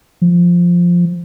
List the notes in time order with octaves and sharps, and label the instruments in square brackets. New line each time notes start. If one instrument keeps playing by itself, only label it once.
[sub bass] F3